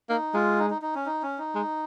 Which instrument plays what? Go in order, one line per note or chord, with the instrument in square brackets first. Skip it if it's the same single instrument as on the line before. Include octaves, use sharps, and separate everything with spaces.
[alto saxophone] A#3 [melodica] D#4
[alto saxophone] G#3 [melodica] F4
[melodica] D#4
D#4
D#4
C#4
D#4
C#4
D#4
[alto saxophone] G#3